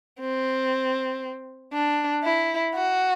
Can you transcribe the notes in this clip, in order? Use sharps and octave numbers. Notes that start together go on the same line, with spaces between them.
C4
D4
E4
F#4